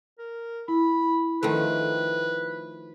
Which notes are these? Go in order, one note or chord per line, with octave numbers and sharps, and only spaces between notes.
A#4
E4 B5
D#3 F3 A3 B4